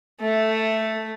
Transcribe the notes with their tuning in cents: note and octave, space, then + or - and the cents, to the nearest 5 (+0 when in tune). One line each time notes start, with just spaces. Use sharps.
A3 +0